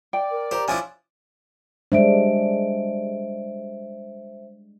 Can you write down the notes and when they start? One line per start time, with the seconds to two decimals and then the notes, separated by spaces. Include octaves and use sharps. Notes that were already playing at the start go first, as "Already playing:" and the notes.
0.13 D5 G5
0.30 A#4
0.51 G4 C5 A#5
0.68 F3 C#4 D4 E4 G#5
1.92 G3 G#3 D4 C5 E5 D7